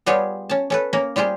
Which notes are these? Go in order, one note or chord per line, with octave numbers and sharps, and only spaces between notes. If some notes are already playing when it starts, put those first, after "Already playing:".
G3 B3 F4 G4 G#4 C#5
C#4 A5
C#4 A4 B4
A#3 C#4 A#4
G3 F4 G4 G#4 C5